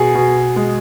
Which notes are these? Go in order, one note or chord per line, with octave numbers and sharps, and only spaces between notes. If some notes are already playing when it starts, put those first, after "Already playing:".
Already playing: B2 G#4
B2
G#3